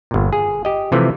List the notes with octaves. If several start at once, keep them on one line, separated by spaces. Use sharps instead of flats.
G1 A#2
G#4
G4 D#5
C3 E3 F3 A3